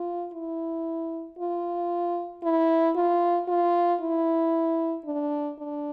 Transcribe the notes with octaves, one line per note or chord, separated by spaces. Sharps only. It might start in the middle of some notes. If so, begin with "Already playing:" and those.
Already playing: F4
E4
F4
E4
F4
F4
E4
D4
D4